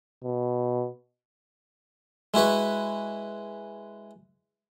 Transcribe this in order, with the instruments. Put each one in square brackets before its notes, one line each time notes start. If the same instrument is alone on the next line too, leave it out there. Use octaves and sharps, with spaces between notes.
[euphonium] B2
[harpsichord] G#3 E4 F#4 B4